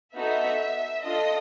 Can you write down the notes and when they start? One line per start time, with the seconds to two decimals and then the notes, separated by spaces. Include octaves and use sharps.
0.16 B3 D#4 F#4 A4 E5
1.04 D4 F4 A4 D#5